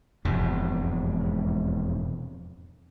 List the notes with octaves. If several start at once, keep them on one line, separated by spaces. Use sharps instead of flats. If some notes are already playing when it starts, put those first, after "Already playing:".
E1 F2 G#2 C3